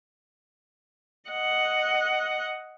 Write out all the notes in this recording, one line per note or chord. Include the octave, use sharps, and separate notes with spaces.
D#5 F#5